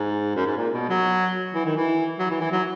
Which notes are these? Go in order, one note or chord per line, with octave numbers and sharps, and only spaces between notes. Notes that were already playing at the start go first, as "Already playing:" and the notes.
Already playing: G#2
F#2
G#2
A#2
B2
F#3
E3
D#3
E3
F#3
E3
E3
F#3